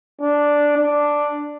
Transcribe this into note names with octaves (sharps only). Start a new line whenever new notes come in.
D4
D4